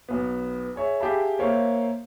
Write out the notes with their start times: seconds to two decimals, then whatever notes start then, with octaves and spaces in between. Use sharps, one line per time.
0.09 B1 B3
0.76 G#4 C#5 E5
1.00 G4 G#4 E5 F5 A5 B5
1.39 A#3 C5 C#5 E5 F5